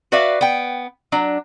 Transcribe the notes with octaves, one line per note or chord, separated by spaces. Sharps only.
F#4 B4 D5 E5 F5
B3 G5
F#3 D4